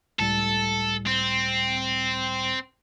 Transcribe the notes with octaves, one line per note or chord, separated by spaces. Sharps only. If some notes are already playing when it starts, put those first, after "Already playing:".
C#2 A2 G3 A4
C4